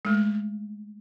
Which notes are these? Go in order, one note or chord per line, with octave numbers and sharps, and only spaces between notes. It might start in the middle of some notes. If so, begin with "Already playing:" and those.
G#3 A3